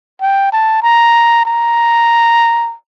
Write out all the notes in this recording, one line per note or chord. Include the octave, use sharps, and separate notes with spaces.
G5
A5
A#5
A#5